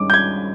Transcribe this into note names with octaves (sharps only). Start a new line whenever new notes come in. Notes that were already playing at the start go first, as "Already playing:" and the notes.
Already playing: G2 D#3 G#3 C#4 D6
G6
G#6